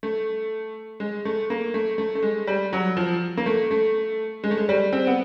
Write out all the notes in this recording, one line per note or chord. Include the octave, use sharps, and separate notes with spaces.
A3
G#3
A3
A#3
A3
A3
A3
G#3
G3
F#3
F3
A#3
A3
A3
G#3
A3
G#3
G3
C4
B3